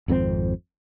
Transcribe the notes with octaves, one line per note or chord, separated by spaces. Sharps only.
G#1 F2 C3 C4